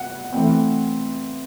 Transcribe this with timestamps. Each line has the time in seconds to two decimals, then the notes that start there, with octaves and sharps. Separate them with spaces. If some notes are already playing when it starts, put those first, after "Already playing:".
Already playing: F#5
0.33 E3 A3 C4